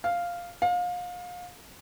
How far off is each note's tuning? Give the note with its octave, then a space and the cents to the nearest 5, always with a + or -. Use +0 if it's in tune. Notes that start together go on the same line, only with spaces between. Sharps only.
F5 -5
F5 +30